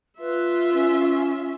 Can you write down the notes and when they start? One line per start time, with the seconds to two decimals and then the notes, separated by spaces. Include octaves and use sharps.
0.20 F4 B4 E5
0.73 C#4